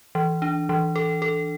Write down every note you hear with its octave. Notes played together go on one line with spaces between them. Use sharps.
E3
D4
E3
A4
A4